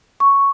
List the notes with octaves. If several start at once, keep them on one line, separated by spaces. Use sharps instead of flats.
C#6